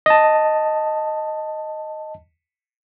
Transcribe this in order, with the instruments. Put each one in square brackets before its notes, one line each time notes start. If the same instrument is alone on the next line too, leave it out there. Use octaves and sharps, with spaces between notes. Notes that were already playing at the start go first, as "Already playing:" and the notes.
[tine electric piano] D#5 A5